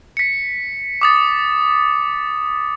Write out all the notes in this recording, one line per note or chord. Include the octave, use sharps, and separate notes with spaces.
B6 C#7
D6 D#6 A6